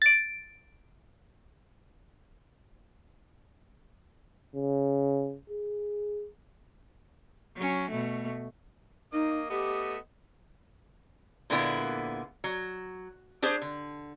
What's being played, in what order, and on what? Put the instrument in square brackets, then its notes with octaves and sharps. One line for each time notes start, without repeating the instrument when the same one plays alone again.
[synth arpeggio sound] A6 D7
[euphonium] C#3
G#4
[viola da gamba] F#3 C#4
B2 A3
[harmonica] A#3 D#5 [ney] D#4
[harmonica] A3 B3 D#5 [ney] G4
[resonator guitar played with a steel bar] A#2 D3 G#3 A#3 B3 E4
F#3
D4 G4 G#4 C5
D3